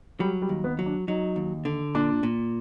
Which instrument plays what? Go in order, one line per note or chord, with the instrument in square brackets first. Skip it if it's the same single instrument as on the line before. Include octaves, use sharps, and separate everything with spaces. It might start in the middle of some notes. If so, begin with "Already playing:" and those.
[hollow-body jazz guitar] F#3 [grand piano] G3
[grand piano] G3
[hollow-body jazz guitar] D#2
[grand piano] B3
[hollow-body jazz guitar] F#3
[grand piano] D4
[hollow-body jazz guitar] F#3 [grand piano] D#4
[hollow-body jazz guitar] D#2
D3
[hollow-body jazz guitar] A#2 [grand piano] D4
[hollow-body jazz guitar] A#2